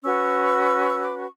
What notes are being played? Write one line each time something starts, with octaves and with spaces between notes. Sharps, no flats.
C#4 F#4 B4 C#6 E6
E6
D6
C#6